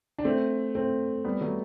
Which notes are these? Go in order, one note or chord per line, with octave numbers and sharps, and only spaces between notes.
D4
A3 C4
A3 C4
G3 B3
F#3 A3